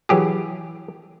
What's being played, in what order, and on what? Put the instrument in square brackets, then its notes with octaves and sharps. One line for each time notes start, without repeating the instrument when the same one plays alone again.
[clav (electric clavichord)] E3 F#3 G4 G#4